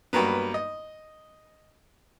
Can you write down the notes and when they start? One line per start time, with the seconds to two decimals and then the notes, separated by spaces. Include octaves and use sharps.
0.13 G2 F#3 A#3 B3
0.54 D#5